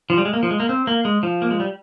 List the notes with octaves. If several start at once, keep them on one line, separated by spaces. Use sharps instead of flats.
F3
G3
G#3
A#3
F3
G#3
A#3
C4
A#3
G#3
F3
A#3
G#3
G3